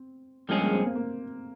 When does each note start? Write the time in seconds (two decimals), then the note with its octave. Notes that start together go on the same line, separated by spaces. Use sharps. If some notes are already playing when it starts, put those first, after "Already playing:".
Already playing: C4
0.48 G2 F3 G#3 A#3 C#4 G#4
0.61 A#3
0.73 C4
0.84 A#3
0.95 A#3